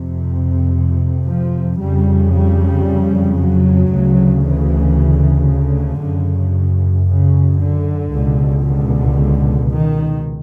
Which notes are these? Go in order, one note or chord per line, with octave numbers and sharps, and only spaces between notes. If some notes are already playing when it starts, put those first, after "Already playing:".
Already playing: F2 C3
F3
F2 C#3 G3
G3
F#3
D2 C#3
E3
D3
F#2 C#3
C#3
D3
C#2 B2
D3
D#3